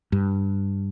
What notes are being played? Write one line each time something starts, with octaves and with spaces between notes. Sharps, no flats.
G2